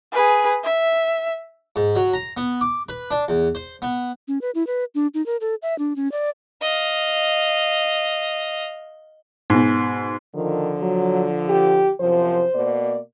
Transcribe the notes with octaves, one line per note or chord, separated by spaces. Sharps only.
G#4 B4
E5
G#2
F#3
A#5
B3
D6
B4
D4
E2
C5
B3
C#4
B4
E4
B4
D4
D#4
A#4
A4
E5
D4
C#4
D5
D#5 F5
G#2 B2
D3 D#3 F3
F#3
G4
F#2 C3 F3 C5
B2 A#3 D5